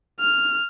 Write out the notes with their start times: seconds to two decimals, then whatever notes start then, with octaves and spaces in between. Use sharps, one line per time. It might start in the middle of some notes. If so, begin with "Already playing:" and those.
0.20 F6